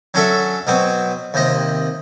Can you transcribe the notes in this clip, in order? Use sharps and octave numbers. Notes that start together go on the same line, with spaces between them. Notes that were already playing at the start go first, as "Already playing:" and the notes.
F#3 C#4 D4 F#4 A4 E5
B2 F#3 B3 C4
D#2 C3 D#5